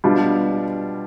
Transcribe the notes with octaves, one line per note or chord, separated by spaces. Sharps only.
B2 G3 D4 F4